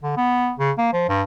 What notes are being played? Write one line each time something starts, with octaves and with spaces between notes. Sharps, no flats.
D3
B3
C#3
A#3
F3
G2